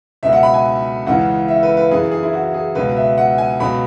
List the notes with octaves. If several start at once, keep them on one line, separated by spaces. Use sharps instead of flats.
C#2 B2 F#3 E5
F#5
B5
G#5
C#2 C#3 E3 F#5
E5
B4
B4
F#2 E3 G#4
G#4
E4
F#4
G#4
C#2 B2 F#3 B4
E5
F#5
G#5
C#2 B2 F#3 B5